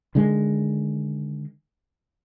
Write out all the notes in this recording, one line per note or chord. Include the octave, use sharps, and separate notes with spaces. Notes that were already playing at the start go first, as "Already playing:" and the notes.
D3 D#3 G#3